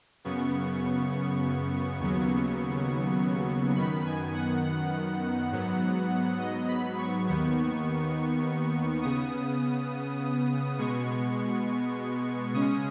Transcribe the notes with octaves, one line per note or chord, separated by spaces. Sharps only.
F#2 C#3 B3 C#6
D#2 C#3 F#3 B3 C#6
F#2 D#3 B3 B5
G#5
F#5
F#5
G#2 F#3 B3
D#5
B5
C#6
D#2 D#3 B3
C#3 B3 D#6
B2 G#3 B3 C#6
C#3 G#3 C#4 D#6